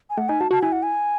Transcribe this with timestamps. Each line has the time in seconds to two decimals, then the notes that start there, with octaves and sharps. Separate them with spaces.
0.10 G#5
0.17 A3 F#5
0.29 D#4 G#5
0.40 F#4 A5
0.51 F#4 A5
0.62 E4 G#5
0.72 F#5
0.83 G#5